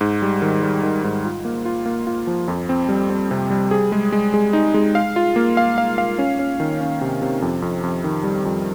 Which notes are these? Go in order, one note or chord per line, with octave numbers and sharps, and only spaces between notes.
G#2
G3
D#3
G3
D#3
G#2
F4
A#3
F4
A#3
F4
F3
F2
C4
G3
C4
C3
G3
G#4
G#3
G#3
G#3
D#4
G#3
F5
F4
A#3
F5
F5
F5
C#4
C#4
D#3
C#4
C3
C3
F2
F2
F2
D#3
G3
F2